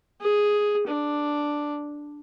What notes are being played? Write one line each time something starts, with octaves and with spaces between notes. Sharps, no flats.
G#4
D4